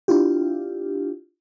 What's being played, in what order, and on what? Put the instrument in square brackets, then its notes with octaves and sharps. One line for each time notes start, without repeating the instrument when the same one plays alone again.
[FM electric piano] D4 E4 F4 G4